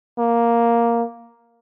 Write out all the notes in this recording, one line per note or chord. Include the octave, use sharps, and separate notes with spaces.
A#3